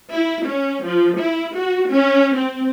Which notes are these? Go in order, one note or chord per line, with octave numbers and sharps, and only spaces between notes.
E4
C#4
F3
E4
F#4
C#4
C4